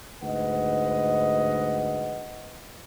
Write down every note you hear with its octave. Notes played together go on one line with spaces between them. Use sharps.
D2 G#2 B4 D#5 F#5